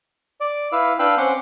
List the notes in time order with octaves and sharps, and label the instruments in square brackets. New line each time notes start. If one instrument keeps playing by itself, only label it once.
[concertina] D5
E4 B4 F5 E6
D4 B4 F5 G5 B5 E6
C4 C#4 F#5 C6 D6